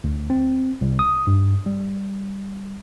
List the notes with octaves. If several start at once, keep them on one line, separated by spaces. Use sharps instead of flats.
D2
C4
C2
D#6
G2
G3